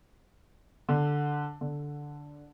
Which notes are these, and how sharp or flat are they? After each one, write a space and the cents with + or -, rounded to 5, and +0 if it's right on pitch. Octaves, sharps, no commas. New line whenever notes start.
D3 +0
D3 -5